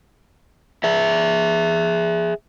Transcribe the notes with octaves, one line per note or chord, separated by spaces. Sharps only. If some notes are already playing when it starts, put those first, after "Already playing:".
G#4 E5